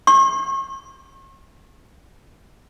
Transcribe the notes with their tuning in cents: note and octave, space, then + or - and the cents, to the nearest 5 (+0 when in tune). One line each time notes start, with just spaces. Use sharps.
C#6 -45